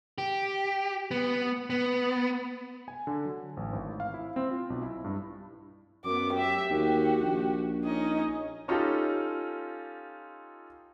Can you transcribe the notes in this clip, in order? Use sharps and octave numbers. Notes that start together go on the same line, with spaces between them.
G4
B3
B3
G#5
D3
F#3
A1
G#1
F5
E4
C4
F4
B1
E4
G2
F#2 B3 A#4 D6
G4 E5
D#2 F#4
A#1
C#4 D#4 D#5
C#4 D#4 F4 G4 A4